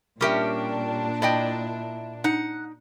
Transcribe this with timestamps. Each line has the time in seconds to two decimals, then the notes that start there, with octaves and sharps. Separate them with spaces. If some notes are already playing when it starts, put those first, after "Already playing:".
0.21 A#2 G3 C#4 D4 G4 A#4 E5
1.22 E4 D5 D#5 G5
2.24 D#4 F#5